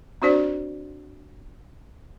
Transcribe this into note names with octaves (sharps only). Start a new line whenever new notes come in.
C4 D4 F#4 C5 D5